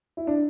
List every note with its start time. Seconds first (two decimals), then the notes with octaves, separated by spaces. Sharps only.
0.17 E4
0.27 D4